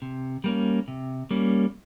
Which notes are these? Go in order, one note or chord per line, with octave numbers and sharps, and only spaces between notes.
C3
G3 A#3 C#4
C3
G3 A#3 C#4